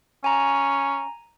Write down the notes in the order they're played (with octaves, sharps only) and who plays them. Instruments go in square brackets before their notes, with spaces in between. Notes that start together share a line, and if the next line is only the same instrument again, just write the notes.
[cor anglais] C#4 [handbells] G#5 A#5